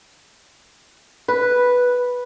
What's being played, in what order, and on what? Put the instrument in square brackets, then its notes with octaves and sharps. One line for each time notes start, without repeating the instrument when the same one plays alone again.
[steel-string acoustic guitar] B4